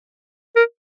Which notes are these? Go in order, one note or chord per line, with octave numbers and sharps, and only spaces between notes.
A#4